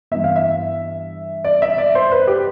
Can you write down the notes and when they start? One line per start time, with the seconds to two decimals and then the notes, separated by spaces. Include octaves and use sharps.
0.11 G2 E3 B3 E5
0.24 F5
0.36 E5
1.44 D5
1.62 E5
1.78 D5
1.95 C5
2.12 B4
2.27 G4